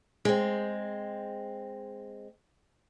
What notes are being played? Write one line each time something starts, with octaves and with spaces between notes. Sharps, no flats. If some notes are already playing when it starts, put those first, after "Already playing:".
G#3 C4